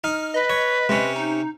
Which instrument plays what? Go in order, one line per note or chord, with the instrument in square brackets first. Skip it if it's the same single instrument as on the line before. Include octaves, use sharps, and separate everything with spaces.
[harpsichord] D#4 [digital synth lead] F6
[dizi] B4 [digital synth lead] D#5
[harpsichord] C#5
[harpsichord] C3 C#4 [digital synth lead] G#3
[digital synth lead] D#4